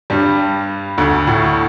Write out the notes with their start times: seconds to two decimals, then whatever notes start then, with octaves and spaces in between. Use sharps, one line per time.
0.10 G2 G3
0.98 D2 D3
1.27 A2